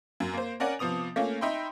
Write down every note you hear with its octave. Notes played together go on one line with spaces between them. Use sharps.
F#2
A#3 C5
C#4 A#4 D5 F#5 G#5
C3 F3 B3 D#6 F7
A3 A#3 C#4 F4
D#4 E5 G5 B5 C6